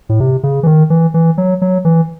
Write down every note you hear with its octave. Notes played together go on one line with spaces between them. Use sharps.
A2
C3
C#3
E3
D#3
E3
E3
F#3
F#3
E3